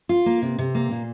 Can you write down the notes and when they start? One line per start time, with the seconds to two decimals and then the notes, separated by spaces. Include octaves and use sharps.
0.09 F4
0.26 A#3
0.42 C3
0.59 C3
0.75 A#3
0.91 A#2